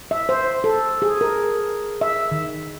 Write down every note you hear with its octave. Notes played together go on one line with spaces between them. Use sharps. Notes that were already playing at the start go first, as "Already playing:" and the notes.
E5
C5
A4
G#4
A#4
E5
D#3